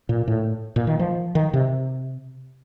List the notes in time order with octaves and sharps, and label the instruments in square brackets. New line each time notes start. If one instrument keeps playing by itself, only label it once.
[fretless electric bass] A#2
A2
A#2
D#3
F3
D#3
C3